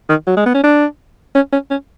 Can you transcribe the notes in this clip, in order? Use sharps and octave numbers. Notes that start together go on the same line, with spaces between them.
D#3
F#3
G#3
B3
C#4
D4
C#4
C#4
C#4